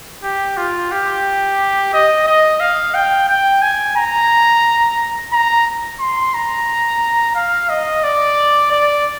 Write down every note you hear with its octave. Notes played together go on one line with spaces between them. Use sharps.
G4
F4
G4
D#5
D#5
F5
G5
G5
G#5
A#5
A#5
C6
A#5
F5
D#5
D5
D5